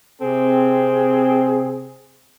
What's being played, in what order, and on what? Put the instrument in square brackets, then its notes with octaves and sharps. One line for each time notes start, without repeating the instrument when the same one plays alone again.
[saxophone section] C3 C4 [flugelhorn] G#4